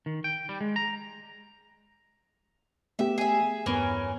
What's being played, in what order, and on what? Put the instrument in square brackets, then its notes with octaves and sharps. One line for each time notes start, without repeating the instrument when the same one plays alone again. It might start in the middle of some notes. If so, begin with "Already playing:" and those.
[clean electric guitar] D#3
G5
G3
G#3
A#5
[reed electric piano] A3 B3 G4 [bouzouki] E5
[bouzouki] G#4 E5
[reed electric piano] E2 G2 B3 [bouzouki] E3 C#4 A#4